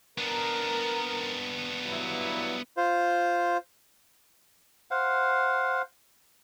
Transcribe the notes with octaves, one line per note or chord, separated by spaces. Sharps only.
B3 D4 A#4
G2 F#3 E4
F4 C5
C5 F5 F#5